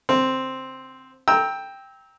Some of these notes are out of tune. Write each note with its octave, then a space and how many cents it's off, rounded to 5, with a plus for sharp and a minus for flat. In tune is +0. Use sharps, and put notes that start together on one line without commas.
D3 +0 C4 +0
G5 +5 A#5 +0 E6 -20